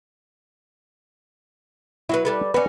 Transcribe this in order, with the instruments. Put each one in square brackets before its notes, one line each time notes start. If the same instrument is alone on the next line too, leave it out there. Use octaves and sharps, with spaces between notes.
[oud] F#3 F#4 B4 [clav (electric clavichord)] E4
[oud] G3 A4 B4
[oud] C#4 F#4 [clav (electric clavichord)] B4 D5